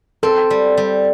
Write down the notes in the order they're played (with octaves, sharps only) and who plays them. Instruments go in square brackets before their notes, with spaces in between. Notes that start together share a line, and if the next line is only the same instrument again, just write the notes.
[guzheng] C4 [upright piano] A4
[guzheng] G3
G3